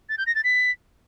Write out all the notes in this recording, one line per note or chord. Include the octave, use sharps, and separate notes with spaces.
A6
G6
A#6
A6
B6